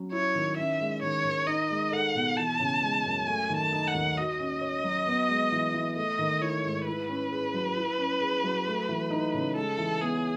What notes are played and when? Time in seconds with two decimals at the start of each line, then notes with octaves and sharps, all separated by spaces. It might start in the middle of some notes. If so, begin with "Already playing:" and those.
Already playing: F#3 C#4
0.12 E4 C#5
0.35 D#3
0.58 C#4 E5
0.80 G#3
1.02 D#3 C#5
1.25 D#3
1.47 D#4 D#5
1.70 G#3
1.92 A4 F#5
2.15 B2
2.37 E3 A5
2.59 C#3
2.82 G#3
3.05 F#2
3.27 A3 G#5
3.50 D#3
3.57 A5
3.72 D#4
3.87 F#5
3.94 D#2
4.17 F#4 D#5
4.40 C#4
4.61 C#5
4.84 F#3
5.06 B3
5.29 G#3
5.52 E3
5.74 E3
5.96 A3 D#5
6.19 D#3
6.41 E4 C#5
6.64 G#2
6.86 E4 B4
7.09 C#4
7.32 G#4
7.54 F#3
7.76 E4
7.98 C#4
8.21 G#4
8.44 F#3
8.67 A3
8.89 E3
9.10 D#4
9.34 C#3
9.55 G#3 A4
9.78 E3
10.01 B3 G#4